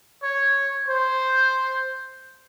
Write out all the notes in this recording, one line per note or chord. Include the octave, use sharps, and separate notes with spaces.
C#5
C5